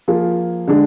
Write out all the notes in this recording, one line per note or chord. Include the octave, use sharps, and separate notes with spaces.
F3 A#3 F4 G#4
D3 G#3 D4